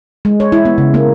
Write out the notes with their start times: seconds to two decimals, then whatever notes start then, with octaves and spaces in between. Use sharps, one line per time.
0.25 G#3
0.40 C#5
0.52 E4
0.65 B3
0.78 C#3
0.94 A#3